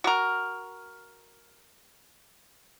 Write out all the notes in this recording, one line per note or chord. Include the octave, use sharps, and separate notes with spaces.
F#4 A#4